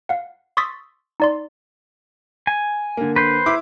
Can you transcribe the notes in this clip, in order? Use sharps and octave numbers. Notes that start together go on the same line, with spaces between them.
F5 F#5
C6 C#6 D#6 E6 A6 B6
D#4 D5 C6
G#5
D3 A#3
B4 C5
E4 D6